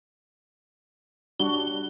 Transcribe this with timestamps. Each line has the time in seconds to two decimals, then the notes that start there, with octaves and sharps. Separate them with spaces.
1.39 G3 D4 F#4 G7